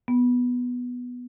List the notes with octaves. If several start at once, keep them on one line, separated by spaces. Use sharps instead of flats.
B3